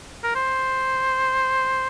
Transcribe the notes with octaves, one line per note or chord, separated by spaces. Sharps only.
A#4
C5